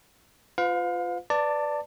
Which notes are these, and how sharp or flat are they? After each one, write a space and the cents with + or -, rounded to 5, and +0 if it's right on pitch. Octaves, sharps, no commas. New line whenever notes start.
F4 +0 B4 +45 F5 +30
B4 +5 D5 +0 A5 +25